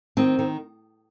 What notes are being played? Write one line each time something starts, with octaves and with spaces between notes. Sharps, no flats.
D#3 C4
D#3